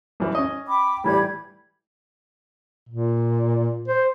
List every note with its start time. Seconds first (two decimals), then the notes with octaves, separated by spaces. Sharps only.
0.20 F#2 E3
0.35 C#4 D#5
0.68 G5 B5 D6
1.04 A2 E3 G3 G4 B5 G#6
2.89 A#2
3.88 C5